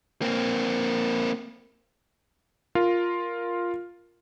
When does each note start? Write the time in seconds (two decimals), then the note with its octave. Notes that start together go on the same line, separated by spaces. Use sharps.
0.22 A#3 C4
2.75 F4 A#4 F5